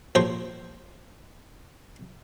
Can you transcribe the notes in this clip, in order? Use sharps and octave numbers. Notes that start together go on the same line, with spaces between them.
A#1 C5 C#5